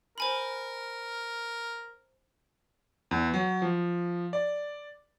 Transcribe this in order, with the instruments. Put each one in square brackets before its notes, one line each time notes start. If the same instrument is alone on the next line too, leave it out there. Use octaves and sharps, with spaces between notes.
[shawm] A#4 [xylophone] C5 G#5 B5
[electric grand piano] E2
F#3
F3
D5